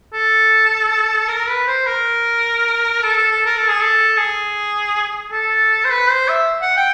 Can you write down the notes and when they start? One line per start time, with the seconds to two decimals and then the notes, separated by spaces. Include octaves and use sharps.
0.13 A4
1.28 A#4
1.49 B4
1.67 C5
1.87 A#4
3.02 A4
3.17 A4
3.31 A4
3.46 A#4
3.57 A4
3.69 G#4
3.81 A4
4.17 G#4
5.32 A4
5.85 C5
5.91 B4
6.10 C5
6.29 E5
6.62 F#5
6.77 G5